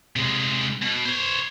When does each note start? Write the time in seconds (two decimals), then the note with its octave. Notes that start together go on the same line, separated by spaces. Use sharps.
0.16 C3 G#3
0.82 B2
1.05 C5 C#5